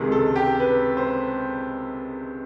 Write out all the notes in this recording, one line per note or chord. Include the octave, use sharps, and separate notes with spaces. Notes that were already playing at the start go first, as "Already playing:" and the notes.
Already playing: C#2 C3 D#3 G#3
A4
G4
B4
C5